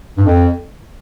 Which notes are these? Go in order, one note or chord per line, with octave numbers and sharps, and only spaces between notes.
G2
F2